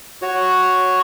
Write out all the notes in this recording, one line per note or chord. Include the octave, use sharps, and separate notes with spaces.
F#4 C#5